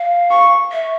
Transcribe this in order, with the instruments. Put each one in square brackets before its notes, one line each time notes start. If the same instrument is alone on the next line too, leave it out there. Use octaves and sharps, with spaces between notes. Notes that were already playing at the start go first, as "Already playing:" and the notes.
Already playing: [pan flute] F5
[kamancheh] C#6
[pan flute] E5